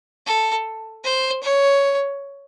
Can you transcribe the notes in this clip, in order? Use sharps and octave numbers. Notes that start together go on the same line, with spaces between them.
A4
C5
C#5